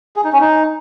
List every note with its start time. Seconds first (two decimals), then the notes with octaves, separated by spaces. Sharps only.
0.16 G#4
0.24 D#4
0.32 C#4
0.41 D#4